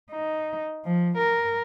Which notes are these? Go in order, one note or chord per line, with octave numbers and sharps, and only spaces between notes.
D#4
F3
A#4